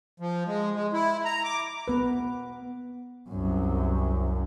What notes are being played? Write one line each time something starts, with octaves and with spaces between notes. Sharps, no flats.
F3
G#3
G#3
E4
A#5
D6
B3 B4
C2 F#2